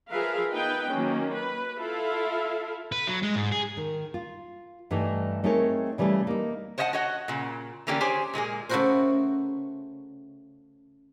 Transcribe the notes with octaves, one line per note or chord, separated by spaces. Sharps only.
F3 G#4 A#4 B4 E5 F5
B3 D#4 B4 G5
D#3 F#3 A#3 C#4
B4
E4 F4 A4 E5 F5
B4
F#3
G#3
G#2
G#4
D#3
F4
G2 E3 G3 A3 D#4
A3 C4 D#4 G#4 A#4 C#5
C#3 E3 G3 A3 E4
A#3 D#4
C5 C#5 D#5 E5 F#5 A5
F#4 C#5 D#5 F#5
A#2 C#3
D3 E3 A#3 C#4 G4 D5
G4 G#4 C5 C#5 G#5
A#2 G#3 A#3 G#4
C#3 A3 E4 F#4 A#4 C5